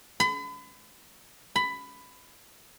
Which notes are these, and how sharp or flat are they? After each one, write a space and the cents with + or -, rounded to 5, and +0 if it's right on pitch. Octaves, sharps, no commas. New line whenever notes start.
B5 +40
B5 +15